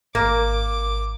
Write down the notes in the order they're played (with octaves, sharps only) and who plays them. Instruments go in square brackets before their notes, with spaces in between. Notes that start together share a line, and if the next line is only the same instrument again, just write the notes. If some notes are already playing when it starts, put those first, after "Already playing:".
[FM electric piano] G#1 [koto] A#3 [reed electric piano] A#4 [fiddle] D6